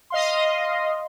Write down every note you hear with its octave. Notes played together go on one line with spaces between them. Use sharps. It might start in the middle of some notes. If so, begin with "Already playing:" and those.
D#5 F5 C6